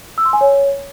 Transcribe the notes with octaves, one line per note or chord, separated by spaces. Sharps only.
E6
C6
G#5
C#5